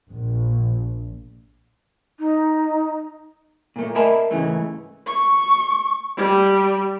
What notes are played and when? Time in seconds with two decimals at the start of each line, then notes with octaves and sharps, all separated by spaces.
0.10 A#1
2.19 D#4
3.76 A#2 A3
3.95 A#4 D#5 E5 G#5 A5 B5
4.31 G#2 C#3 E3 A3
5.07 C#6
6.17 G3